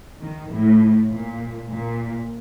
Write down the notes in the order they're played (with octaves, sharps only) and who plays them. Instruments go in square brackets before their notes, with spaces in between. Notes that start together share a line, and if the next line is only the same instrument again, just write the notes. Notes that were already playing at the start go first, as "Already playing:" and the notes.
[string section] D#3
A2
A#2
A#2